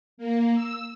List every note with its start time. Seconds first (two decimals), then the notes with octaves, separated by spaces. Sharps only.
0.18 A#3
0.55 E6